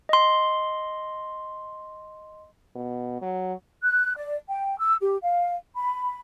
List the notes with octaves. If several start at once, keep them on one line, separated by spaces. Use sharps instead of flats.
D#5 C6
B2
F#3
F#6
D5
G5
E6
G4
F5
B5